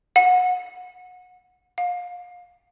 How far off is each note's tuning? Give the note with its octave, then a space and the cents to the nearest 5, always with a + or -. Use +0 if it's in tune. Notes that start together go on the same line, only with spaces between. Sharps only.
F#5 -25
F5 +30